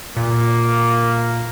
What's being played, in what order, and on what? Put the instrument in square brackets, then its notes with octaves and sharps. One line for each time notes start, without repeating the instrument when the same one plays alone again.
[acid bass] A#2 [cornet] A#3